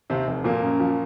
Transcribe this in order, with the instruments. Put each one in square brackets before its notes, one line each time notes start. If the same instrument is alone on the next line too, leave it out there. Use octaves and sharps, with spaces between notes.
[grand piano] D#2 [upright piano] C3 C4
[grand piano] F1
[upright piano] A#2 A#3 [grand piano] F3
[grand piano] F#2
F3